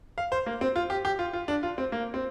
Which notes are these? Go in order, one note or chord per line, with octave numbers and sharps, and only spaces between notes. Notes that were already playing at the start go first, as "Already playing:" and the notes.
F5
C5
A#3
C4
F4
G4
G4
F4
F4
D4
F4
C4
A#3
C4